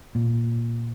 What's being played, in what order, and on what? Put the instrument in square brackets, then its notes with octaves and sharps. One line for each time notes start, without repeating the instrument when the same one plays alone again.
[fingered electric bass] A#2